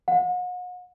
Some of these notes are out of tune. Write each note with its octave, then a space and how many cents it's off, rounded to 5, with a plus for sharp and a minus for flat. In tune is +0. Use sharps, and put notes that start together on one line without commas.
F#5 -40